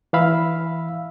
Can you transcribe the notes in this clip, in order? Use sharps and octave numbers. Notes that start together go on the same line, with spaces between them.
E3 E5 F5 B5 E6